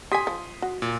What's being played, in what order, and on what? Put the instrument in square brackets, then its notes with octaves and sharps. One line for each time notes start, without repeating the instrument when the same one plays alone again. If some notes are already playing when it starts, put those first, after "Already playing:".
[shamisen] G4 G#5 [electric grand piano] C6 D#6 B6
[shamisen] F3
F#4
[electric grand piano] A#2